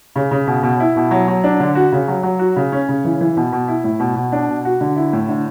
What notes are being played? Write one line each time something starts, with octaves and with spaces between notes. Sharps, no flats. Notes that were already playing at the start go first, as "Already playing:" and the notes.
C#3
C#3
B2
B2
E4
B2
F#3
F#3
D4
D3
F#4
C#3
F#3
F#3
F#4
C#3
C#4
C#3
E3
E3
B2
B2
E4
A2
B2
B2
D4
B2
F#4
D3
E4
A2
D3